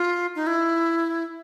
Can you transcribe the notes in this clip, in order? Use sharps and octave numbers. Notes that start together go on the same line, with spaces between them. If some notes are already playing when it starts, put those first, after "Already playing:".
Already playing: F4
D#4
E4